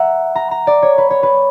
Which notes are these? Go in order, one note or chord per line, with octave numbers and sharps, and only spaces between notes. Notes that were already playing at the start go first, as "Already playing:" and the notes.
Already playing: E5 F#5 A#5
A#5
A#5
D5
C#5
B4
C#5
B4